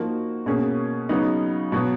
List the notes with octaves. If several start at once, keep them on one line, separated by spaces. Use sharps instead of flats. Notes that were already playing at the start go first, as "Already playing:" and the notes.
Already playing: F3 A#3 D#4 F#4
B2 A#3 C#4 G#4
C#3 F#3 B3 D#4
B2 F#3 B3 F#4